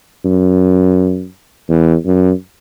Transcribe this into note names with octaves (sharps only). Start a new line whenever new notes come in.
F#2
E2
F#2